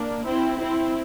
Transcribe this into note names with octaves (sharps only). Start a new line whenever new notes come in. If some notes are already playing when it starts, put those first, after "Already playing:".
Already playing: A#3 D4
C4 E4
C4 E4